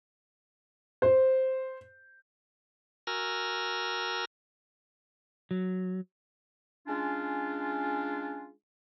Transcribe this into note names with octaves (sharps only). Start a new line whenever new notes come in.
C5
F#4 A#4 G#5 A#5 E6 F6
F#3
G#3 C#4 D4 F4